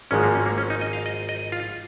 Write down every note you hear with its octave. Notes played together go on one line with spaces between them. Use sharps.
G#1 G#2 F3 G#3 C#4
A#3
C#4
A#3
C#4
D#4
D#5
F5
D#5
D#5
F4